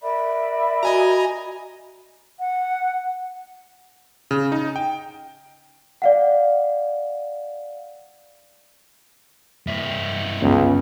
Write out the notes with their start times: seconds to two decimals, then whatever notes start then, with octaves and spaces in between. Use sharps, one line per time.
0.01 A#4 D5 E5 B5
0.83 F#4 D#5 G#5 A#5
2.39 F#5
4.31 C#3
4.52 D#4
4.76 G5
6.02 D5 F5 F#5
9.67 G2 E4
10.42 G1 C#2 C#4